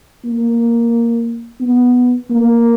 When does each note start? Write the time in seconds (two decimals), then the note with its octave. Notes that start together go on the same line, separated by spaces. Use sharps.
0.25 A#3
1.61 B3
2.30 A#3